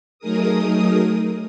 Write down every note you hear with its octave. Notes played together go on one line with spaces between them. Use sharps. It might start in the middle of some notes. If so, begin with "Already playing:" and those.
F#3 A3 D#4 G#4 A#4 D#6